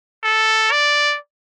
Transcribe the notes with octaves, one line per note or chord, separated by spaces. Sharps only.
A4
D5